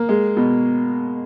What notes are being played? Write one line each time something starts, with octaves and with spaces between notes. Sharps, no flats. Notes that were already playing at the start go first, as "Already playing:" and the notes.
Already playing: A#3
G#3
B2